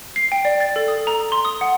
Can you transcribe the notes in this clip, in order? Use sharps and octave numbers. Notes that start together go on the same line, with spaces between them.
C7
G5
D5
A6
A4
D#6
A#5
C6
D#6
F#5